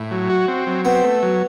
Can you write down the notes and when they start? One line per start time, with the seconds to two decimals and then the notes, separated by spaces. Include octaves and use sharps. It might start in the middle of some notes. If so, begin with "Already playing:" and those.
Already playing: A2 E4
0.11 F#3
0.30 F#4
0.48 C4
0.67 F#3
0.85 B3 C4
1.03 A3
1.23 F#3